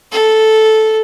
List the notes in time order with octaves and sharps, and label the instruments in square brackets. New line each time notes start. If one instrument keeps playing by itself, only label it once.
[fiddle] A4